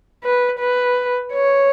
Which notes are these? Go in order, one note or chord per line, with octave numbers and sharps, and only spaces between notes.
B4
B4
C#5